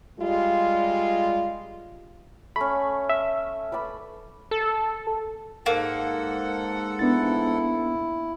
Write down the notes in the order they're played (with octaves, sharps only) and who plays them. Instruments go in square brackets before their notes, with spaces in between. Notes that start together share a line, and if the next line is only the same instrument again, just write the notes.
[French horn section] G3 G#3 F4
[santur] A3 C#4 [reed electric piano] B5
[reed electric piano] E5
[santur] B4 D5 B5
[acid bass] A4
[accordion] G#2 A4 F#5 [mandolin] A#3
[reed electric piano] B3 D4 A6 [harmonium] E4